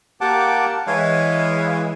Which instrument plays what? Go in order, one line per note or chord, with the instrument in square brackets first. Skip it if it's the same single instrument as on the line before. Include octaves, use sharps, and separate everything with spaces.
[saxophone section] A#3 G4 [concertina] F#5 A5 D6
[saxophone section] E3 G#3 [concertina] C#5 F5